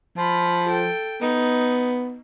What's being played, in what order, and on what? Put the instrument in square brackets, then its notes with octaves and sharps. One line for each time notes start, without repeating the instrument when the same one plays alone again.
[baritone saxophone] F3 [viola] F4 B5
[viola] A4 G5
[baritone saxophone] B3 [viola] D#4